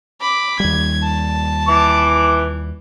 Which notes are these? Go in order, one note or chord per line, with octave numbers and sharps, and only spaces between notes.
B5 D6
D#2 G3 G#6
A5
E3 D6